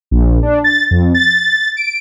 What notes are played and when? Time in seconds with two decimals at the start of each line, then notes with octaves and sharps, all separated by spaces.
0.11 A#1
0.43 D4
0.64 A6
0.91 F2
1.14 A6
1.77 D7